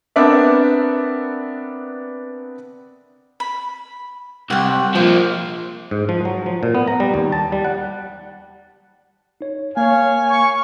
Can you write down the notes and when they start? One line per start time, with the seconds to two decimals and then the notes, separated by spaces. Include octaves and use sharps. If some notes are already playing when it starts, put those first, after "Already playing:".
0.16 B3 C4 D4 A#4 D5 E5
3.40 B5
4.50 C2 F#5 G5
4.95 F3 A#3 C5
5.91 G#2
6.09 F3
6.25 F#3
6.46 F3
6.63 A#2
6.75 B3
6.87 A#5
7.00 G3
7.14 D#2
7.32 A5
7.52 G3
7.65 F#5
9.41 D#4 C#5
9.77 A#3 C#5 F5 G#5
10.29 F5 C#6